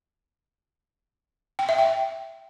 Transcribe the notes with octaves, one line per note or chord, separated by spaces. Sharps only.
G5
E5
G5